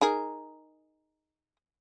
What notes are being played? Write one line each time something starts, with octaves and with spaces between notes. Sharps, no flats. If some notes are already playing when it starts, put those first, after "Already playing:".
D#4 G#4 A#4